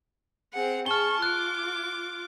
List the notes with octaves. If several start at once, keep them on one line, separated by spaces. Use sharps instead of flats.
C4 G#4 F#5
G#4 A5 C#6 F6 G7
F4 D6 F#6